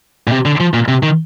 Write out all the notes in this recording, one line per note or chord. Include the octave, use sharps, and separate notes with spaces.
A#2
C3
D3
F3
A#2
C3
D#3